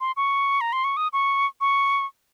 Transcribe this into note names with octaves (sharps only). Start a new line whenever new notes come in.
C6
C#6
A#5
C6
C#6
D#6
C#6
C#6